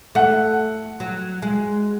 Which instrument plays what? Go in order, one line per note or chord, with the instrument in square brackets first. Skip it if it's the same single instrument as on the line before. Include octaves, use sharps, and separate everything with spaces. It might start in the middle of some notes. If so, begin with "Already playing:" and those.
[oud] A3 [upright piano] F#5
[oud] F#3
G#3